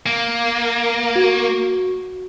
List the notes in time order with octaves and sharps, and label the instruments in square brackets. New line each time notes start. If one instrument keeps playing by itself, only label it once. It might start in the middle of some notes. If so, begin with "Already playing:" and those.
[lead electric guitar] A#3
[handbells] F#4